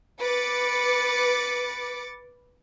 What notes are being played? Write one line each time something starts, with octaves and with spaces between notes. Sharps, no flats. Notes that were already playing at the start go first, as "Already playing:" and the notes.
B4 D6 A6 C#7